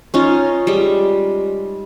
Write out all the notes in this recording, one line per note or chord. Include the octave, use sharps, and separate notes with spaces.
C#4 D#4 F4
G3 G#3